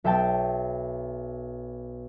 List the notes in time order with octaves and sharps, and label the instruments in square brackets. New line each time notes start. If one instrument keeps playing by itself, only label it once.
[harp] B1 E5 G5 A5 A6